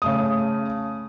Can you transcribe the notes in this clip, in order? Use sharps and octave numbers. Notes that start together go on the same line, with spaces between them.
C#3 A3 D#6